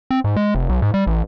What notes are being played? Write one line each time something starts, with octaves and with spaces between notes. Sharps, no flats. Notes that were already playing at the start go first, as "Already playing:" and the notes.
C4
G#2
G#3
F1
B1
G#2
G3
A1